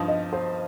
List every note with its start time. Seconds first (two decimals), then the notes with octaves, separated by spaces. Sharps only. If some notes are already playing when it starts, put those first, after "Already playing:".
Already playing: G2 F3 D#4
0.08 D#5
0.33 C5